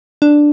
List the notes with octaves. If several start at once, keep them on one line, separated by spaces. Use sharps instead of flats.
D4